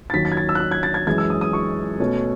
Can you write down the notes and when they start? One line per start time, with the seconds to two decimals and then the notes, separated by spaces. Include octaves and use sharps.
0.10 A6
0.13 D#2 D#3 F#3 C#4 B6
0.25 A6
0.32 G#6
0.37 A6
0.49 E6
0.55 F#6
0.60 E6
0.71 G#6
0.83 A6
0.94 G#6
1.07 F#2 E3 G#3 C#4 G#6
1.18 E6
1.30 D#6
1.41 D#6
1.53 C#6
1.99 B2 A3 C#4